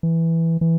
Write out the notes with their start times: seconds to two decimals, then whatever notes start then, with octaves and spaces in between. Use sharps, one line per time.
0.03 E3
0.61 E3